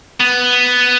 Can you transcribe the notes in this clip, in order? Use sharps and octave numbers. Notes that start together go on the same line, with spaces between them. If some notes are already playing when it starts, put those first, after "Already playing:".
B3